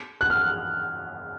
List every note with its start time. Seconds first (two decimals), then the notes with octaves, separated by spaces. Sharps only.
0.21 F#6
0.30 F6